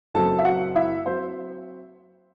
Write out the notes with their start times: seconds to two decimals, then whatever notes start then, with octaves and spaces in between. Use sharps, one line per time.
0.14 F#1 F#2 F#3 C4 A4 A5
0.39 E5
0.45 F#4 F#5
0.75 E4 E5
1.06 F#3 C4 C5